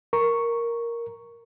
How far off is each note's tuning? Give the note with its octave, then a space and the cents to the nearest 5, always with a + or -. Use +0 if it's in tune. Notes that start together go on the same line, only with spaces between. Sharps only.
A#4 +0 C#6 +0